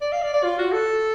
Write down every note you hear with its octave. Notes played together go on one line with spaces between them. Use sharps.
D5
F5
D5
D5
F4
F#4
A4